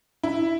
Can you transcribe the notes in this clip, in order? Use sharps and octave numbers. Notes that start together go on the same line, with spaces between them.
E4